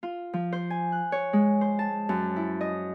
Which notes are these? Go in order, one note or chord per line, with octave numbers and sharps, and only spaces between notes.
F4
F3
C5
G#5
F#6
C#5
G#3
C5
A5
F#2
E4
D#5